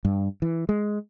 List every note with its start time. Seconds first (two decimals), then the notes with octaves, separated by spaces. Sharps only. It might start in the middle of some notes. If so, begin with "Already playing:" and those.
0.05 G2
0.42 E3
0.69 G#3